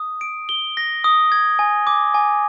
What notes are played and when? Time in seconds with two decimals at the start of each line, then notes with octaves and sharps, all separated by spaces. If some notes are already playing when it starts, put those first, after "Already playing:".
Already playing: D#6
0.21 D7
0.49 G7
0.77 A#6
1.04 D#6
1.32 G#6
1.59 G#5
1.87 D6
2.14 G#5